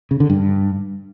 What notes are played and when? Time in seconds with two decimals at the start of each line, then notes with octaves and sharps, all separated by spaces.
0.11 C#3
0.20 D3
0.30 G2